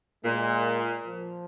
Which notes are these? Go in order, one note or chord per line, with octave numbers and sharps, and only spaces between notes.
A#2 G#3
F3